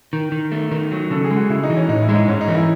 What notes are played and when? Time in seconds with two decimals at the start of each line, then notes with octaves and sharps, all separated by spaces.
0.13 D#3
0.32 D#3
0.52 A3
0.71 D#3
0.91 F#3
1.11 C#3 A4
1.24 G#4
1.31 G#3
1.36 F#4
1.50 C#3 E4
1.63 D#4
1.70 E3
1.76 C#4
1.88 A2 D#4
2.02 E4
2.09 G#3
2.15 D#4
2.28 G#2 C#4
2.41 D#4
2.48 E3
2.55 E4